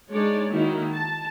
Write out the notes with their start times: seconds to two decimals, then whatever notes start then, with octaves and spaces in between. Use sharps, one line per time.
0.11 G#3 D4 D#4 C#5 D5
0.51 D#3 A#3 D#4 E4 F#4
0.94 A5